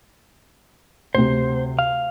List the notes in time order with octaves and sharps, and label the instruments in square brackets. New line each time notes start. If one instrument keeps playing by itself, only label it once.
[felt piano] D2 C3 [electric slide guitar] C5
[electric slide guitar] F5